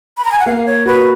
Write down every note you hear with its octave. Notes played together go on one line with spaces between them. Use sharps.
B5
A#5
G#5
F#5
A#3 F5
C#5
F#4 B4